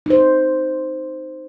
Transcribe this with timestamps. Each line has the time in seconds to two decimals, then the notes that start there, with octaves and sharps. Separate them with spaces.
0.06 D#4 C5